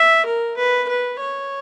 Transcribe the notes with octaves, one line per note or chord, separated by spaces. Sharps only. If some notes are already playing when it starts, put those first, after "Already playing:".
Already playing: E5
A#4
B4
B4
C#5